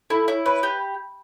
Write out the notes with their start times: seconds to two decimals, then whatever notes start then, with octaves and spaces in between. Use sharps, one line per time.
0.10 E4 A4
0.28 E4 C#5
0.46 B4 C#5
0.63 G4